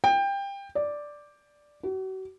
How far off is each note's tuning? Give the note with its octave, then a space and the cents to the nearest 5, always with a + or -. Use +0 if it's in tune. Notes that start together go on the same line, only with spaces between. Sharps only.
G5 +20
D5 +0
F#4 +40